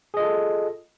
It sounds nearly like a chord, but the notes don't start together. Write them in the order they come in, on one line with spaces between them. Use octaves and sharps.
G#4 D#5 F4 A4